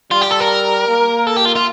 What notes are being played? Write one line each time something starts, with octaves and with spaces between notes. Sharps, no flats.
G3 F4
G4
A4
A#4
A#3
A4
G4
F4
F4